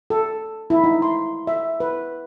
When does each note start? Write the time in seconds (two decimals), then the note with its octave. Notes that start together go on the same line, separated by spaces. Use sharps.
0.10 A4
0.70 E4
0.84 D#4
1.02 C6
1.47 E5
1.80 B4